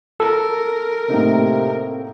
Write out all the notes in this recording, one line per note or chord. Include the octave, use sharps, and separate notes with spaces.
A4 A#4
A2 C3 A#3 D#4